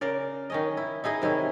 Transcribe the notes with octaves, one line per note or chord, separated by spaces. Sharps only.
C#3 A#4 D5
D#3 C#4 D#5
E4
D#4 E4 G#4 D#5
C3 D#3 C#4 E4